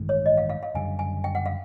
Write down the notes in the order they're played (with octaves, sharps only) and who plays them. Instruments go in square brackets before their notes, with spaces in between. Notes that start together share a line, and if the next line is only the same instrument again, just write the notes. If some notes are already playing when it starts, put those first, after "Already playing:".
Already playing: [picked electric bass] A1 G2 D#3 G#3
[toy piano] C#5
D#5
F5
F5
F5
[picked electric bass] F#1 F#2 D3 G3 [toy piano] G#5
[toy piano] G#5
G5
F#5
F5